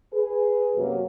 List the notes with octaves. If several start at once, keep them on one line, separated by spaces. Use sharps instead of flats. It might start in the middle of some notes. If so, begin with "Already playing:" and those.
G#4 B4
F#2 C3 F#3 A#3